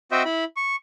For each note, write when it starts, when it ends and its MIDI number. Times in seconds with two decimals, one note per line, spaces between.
0.12 0.23 60
0.12 0.23 66
0.12 0.23 72
0.12 0.23 75
0.12 0.23 76
0.12 0.23 79
0.25 0.44 64
0.25 0.44 83
0.56 0.76 85